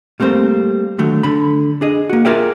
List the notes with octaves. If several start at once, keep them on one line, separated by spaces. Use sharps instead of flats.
G3 A3 A#3 C4 C5
D3 D#3 F#3 A3
D3 B5
D4 G#4 D#5
A#3 F#4
F4 G#4 A#4 D5 E5 G5